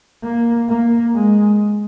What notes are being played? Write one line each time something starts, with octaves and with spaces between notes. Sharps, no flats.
A#3
A#3
G#3